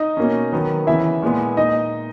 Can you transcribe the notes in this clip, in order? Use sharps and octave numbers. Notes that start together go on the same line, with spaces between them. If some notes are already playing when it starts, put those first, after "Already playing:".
Already playing: D#4 D#5
B2 A#3 C#4
D#3 F#3 B3
C#3 E3 B3 E4 E5
A#2 G#3 B3
A#2 D#4 D#5